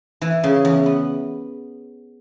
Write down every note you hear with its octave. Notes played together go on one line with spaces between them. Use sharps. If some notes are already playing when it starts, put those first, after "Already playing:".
E3
C#3
E2
B3